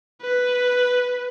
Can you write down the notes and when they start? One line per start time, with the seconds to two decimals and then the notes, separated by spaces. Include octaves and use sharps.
0.21 B4